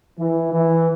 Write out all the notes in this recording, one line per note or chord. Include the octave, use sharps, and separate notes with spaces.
E3
E3